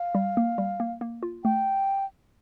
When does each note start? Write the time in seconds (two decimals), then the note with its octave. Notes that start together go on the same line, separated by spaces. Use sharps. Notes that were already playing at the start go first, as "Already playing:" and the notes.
Already playing: F5
0.15 G3
0.37 A#3
0.58 G3
0.80 A#3
1.01 A#3
1.23 F4
1.44 A3 G5